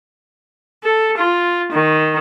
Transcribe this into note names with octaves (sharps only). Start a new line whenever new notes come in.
A4
F4
D#3